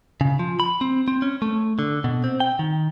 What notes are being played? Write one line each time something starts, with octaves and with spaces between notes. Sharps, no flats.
C#3
F3
B5
C4
C4
C#4
A3
D3
B2
C4
G5
D#3